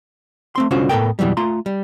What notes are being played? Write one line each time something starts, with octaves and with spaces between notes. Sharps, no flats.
A3 C4 C6
C2 D3 C#4 F4 F#4 C5
A2 B3 A4 A#4 G5
F2 B2 E3 F#3 G3
A3 F4 A#5 C6
G3